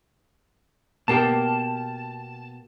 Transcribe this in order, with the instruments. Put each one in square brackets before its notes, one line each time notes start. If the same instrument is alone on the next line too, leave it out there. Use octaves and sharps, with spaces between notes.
[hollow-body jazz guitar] B2 A#3 G4 [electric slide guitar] A5